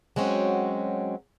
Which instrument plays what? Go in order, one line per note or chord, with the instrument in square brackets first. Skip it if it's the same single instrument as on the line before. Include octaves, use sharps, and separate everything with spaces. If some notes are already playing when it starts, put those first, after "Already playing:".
[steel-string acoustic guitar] F#3 G#3 C4 C#4 F#4